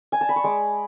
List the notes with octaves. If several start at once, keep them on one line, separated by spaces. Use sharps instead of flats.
G#5
A5
B5
C#6
G#3 D6